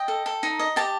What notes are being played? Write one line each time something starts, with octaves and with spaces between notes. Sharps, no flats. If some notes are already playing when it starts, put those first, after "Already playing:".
Already playing: D#5 G5
A4
A4
D#4
D#5
G4 A5